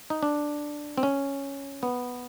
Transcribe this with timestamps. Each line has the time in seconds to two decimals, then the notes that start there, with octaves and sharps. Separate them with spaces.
0.10 D#4
0.23 D4
0.98 C4
1.03 C#4
1.83 B3